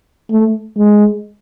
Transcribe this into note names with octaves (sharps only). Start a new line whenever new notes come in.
A3
G#3